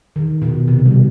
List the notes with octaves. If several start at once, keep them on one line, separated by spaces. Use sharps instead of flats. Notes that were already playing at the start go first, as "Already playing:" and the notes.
D#3
B2
C3
G3